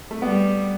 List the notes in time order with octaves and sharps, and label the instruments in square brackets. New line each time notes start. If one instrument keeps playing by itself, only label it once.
[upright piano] A3
[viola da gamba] G3 [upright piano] B3